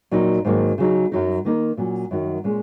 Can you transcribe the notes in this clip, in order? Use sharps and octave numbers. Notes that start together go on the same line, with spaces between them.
A#2 F#3 D#4
G#2 D#3 F#3 A#3
C#3 F#3 D#4
F#2 F#3 D#4
D#3 A#3 D#4
A#2 F#3 C#4
F#2 D#3 F#3
A#2 G#3 C#4